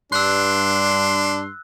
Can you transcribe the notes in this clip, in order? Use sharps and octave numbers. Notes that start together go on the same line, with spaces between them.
G2 D4 C6 E6 F#6